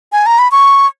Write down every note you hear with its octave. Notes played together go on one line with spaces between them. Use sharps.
G#5
A#5
B5
C#6